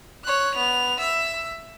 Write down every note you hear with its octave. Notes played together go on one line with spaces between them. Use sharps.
C#5 F#6
B3 F7
E5 E6